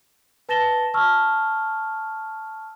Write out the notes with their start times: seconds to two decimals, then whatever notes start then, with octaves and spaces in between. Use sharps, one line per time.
0.49 B4 A5 A6 A#6 E7 G7
0.94 A5 C#6 E6 F6